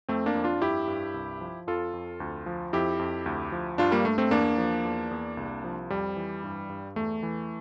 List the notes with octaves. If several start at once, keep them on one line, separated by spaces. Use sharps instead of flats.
F2 A3 C4
A#3 D4
F2
D4 F4
G2 E4 G4
G2
C2
F3
F2 F4 A4
F2
D2
F3
F2 E4 G4
F2
D2
F3
G2 D4 F4
G3 A#3
G2 A3
A3 C4
E2 A#3 D4
F3
E2
E2
C2
F3
F2 G3
E3
G2
G2
E2 A3
E3